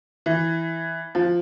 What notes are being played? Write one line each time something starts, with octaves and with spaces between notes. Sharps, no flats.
E3
F3